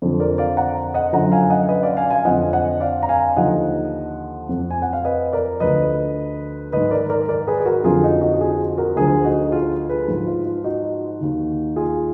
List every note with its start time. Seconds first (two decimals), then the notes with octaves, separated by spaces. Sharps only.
0.02 F2 D3 F3
0.20 A#4 D5
0.38 D5 F5
0.57 F#5 A#5
0.94 D#5 F#5
1.13 F#2 D3 F3 F#5 A#5
1.32 F5 G#5
1.50 D#5 F#5
1.69 B4 D#5
1.83 D5 F5
1.97 F5 G#5
2.11 F5 G#5
2.25 F2 D3 F3 D#5 F#5
2.53 D#5 F#5
2.80 D5 F5
3.03 A#5
3.09 F5 G#5
3.37 D#2 D3 F3 D#5 F#5
4.49 F2 F3
4.71 G#5
4.82 F#5
4.93 F5
5.05 B4 D#5
5.33 A#4 D5
5.60 D2 D3 F3 B4 D#5
6.72 G#2 D#3 B4 D#5
6.91 A#4 D5
7.10 A#4 D5
7.29 A#4 D5
7.47 G#4 B4
7.60 G#4
7.65 F#4 A#4
7.84 F2 D3 F3 F4 G#4
8.03 D#4 F#4
8.21 D#4 F#4
8.36 F#4
8.40 F4 G#4
8.78 F#4 A#4
8.96 D2 D3 F3 F4 G#4
9.24 D#4 F#4
9.52 F4 G#4
9.89 G#4 B4
10.08 G#2 F3
10.26 F4
10.45 F4
10.64 D#4 F#4
11.21 D#2 D#3
11.76 F4 G#4